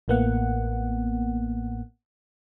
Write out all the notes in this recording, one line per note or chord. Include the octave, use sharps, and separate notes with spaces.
A1 A2 A#3 B3 F#5